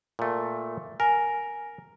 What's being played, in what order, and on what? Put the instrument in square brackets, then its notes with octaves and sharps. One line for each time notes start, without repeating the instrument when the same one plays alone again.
[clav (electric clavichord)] A#2 A3
[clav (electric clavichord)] A#4 [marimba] G#5